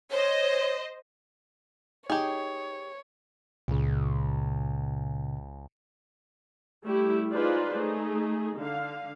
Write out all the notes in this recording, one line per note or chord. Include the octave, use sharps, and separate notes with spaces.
C5 C#5 D#5
D#4 G4 G#4 C#5
C#2 A#2 C#3
G3 A3 E4 G4
D#4 F4 G#4 B4 C5 D5
A3 D#4 G#4
D3 F5